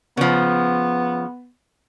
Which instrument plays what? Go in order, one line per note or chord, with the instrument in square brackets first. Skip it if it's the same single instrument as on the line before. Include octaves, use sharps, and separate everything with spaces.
[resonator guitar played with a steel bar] C#3 F3 [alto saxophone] B3